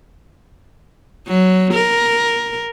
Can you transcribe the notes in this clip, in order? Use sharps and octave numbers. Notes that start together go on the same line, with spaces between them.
F#3
A#4